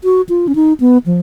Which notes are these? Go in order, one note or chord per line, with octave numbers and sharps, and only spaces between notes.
F#4
F4
C#4
D#4
B3
F3